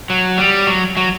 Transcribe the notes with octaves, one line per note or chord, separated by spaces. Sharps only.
F#3
G3
F#3
F#3